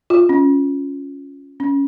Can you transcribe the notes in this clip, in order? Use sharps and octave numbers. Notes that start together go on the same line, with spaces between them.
F4
C#4
C#4